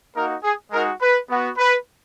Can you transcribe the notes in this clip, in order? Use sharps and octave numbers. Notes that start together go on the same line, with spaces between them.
A#3 D#4 F#4 A#4
G#4
G#3 D#4 F#4 A#4
B4
B3 F#4
B4